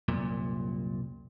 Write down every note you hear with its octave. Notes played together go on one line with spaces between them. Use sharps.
C2 F#2 A#2